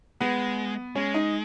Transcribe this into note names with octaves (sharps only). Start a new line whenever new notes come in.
G#3 B3
G#3 C#4
D#4